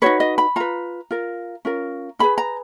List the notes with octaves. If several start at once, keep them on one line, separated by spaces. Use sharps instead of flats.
D#4 F#4 B4 C#5
D#5
B5
F4 B4 A#5
F4 A#4
C#4 F4 A#4
D#4 G#4 B4 B5
A#5